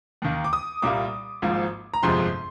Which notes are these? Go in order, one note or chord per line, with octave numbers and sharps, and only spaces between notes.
D#2 D#3 A#3
D6
D#6
C2 A#2 G3 A#3 D6
G#1 G#2 F3 A#3
A#5
G1 F2 C3 F3 G#3 C6